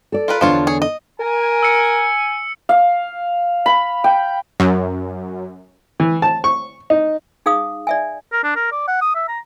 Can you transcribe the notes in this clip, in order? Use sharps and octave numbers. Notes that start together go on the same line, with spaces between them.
A4 D5
F4 A#4 B4
E2 D3 F3 D4 F4 C#5
G#4 C#5
D#5
A#4 G#5
E6 C#7
F5
B5
G5
F#2
E3
A5
C#6
D#4
D#4 G#4 F5 D#6
D5 E5 G#5
A#4
D4
A#4
D5
F#5
D#6
E5
A#5